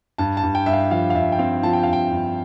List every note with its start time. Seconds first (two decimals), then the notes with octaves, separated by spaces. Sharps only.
0.18 G2 A5
0.37 A5
0.43 G2
0.55 G5
0.66 G2 E5
0.73 F5
0.91 F3 F5
1.10 F5
1.15 G2 E5
1.32 G5
1.39 C4 F5
1.63 F3 A5
1.73 G5
1.83 G2 F5
1.93 G5
2.11 G2